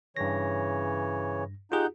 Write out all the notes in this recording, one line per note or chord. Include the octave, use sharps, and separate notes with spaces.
G2 C#3 E3 C#5 A#6
D#4 F4 G4 G#4 F#5 G6